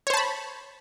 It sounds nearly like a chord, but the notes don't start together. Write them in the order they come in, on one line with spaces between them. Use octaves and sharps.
C#5 C5 A5 B5